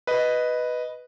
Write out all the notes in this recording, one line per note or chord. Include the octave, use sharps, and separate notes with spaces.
B4 D#5